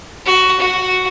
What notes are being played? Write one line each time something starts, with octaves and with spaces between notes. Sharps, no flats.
F#4
F#4